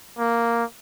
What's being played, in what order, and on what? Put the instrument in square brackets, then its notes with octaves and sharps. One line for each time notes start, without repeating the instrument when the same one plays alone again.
[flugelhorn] A#3